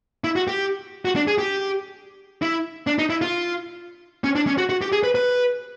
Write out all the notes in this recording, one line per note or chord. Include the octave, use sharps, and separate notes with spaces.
E4
F#4
G4
F#4
D4
G#4
G4
E4
D4
D#4
E4
F4
C#4
D4
C#4
F#4
F#4
G4
G#4
B4
B4